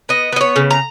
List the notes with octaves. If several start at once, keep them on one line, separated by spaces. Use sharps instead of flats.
B3 D#5
B3 D#5
C#5
C#3
A#5